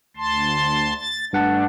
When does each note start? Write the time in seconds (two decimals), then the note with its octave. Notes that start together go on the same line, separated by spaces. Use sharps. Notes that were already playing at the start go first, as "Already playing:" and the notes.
0.17 D2 A5 C6
0.98 A6
1.33 G2 A3 D4 F#5 A5